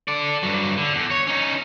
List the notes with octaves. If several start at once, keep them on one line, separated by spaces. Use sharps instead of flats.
A4 D5
G2 F#3
D3
E2
C#5
C#4 D#4